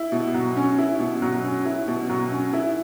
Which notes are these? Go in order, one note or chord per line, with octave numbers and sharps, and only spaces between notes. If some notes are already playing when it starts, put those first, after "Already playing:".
Already playing: E4
B2
F#3
C#4
E4
B2
F#3
C#4
E4
B2
F#3
C#4
E4